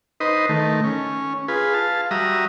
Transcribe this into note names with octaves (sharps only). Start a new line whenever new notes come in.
D#4 B4 C5 D#5
D#3 A3
C#4
F4 G#4 B4
F5 A5
G3 F#4 E5 A#5 D#6